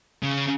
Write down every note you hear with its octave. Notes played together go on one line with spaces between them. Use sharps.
C#3